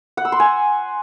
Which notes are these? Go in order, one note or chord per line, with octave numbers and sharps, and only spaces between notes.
F#5
E6
C6
G#5